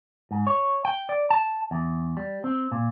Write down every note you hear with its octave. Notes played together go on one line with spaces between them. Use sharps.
G#2
C#5
G5
D5
A5
E2
G3
C4
A#2